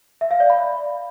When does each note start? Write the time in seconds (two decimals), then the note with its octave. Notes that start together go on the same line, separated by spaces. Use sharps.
0.21 E5
0.31 F5
0.40 D5
0.50 B5